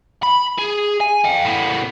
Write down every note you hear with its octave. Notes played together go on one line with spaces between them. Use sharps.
B5
G#4
G#5
F5 G5
A2 B3